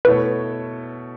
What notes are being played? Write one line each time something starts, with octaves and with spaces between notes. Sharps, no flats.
B2 A3 E4 A4 B4 C#5